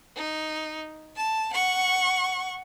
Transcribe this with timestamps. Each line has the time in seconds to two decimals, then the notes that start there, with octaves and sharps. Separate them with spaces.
0.16 D#4
1.16 A5
1.53 F#5 C#6